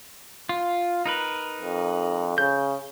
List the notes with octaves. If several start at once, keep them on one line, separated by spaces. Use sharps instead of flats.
F4
D#4 A#4 B4
F2
C#3 G6